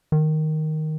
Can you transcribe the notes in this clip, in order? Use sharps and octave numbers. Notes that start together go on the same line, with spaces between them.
D#3